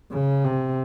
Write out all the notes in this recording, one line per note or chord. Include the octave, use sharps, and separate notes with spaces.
C#3
C3